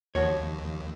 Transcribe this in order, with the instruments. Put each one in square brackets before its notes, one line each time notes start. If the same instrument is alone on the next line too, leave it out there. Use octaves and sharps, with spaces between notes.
[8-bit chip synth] D#2 [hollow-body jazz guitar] F3 F#4 C#5